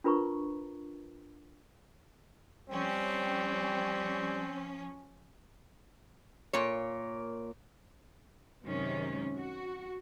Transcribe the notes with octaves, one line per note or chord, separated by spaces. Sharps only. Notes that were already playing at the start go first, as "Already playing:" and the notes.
D4 F4 A#4 B4 A#5 C#6
F3 G3 C4 C#4
A#2 A#3 C#5
F#2 C3 D#3 G#3 C#4
F#4